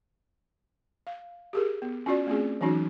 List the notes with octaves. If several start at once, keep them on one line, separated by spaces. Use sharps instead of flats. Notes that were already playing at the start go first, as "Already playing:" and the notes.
F5
G4 G#4 A#4
B3
C#4 F4 F#4 D5
A3 C4 C#4 F4 G#4
E3 F#3 C#4 D#4 F#4